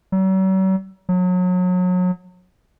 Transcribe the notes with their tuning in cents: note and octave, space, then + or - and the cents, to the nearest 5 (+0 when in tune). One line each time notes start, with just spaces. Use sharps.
F#3 +45
F#3 -30